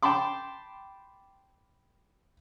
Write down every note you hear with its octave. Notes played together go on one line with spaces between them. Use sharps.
G5 A5 B5 C6 D6